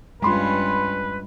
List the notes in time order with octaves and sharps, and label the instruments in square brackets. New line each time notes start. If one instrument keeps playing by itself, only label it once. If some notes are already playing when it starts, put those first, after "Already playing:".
[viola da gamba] G2 C#4 [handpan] G#3 F4 [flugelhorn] B4 [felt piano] B5 C6